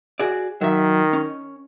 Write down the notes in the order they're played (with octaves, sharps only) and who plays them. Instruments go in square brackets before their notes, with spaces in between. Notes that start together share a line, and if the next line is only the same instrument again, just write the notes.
[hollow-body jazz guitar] F#4 G#4 D5
[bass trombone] D#3 [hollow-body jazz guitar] F#3 E5
[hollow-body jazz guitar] C#4